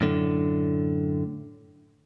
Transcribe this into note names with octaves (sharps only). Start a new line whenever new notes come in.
F#2 A2 D3